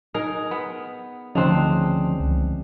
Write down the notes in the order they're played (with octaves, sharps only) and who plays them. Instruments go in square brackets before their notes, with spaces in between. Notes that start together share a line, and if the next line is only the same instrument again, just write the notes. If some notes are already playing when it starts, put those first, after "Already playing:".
[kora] D#4 G#4 A#4
B3
[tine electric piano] D2 C#3 [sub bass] F3 [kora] C4 D4 D#4
[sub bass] C#2